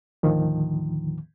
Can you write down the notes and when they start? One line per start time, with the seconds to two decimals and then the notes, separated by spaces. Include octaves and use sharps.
0.23 D#2 A2 D3 D#3 F3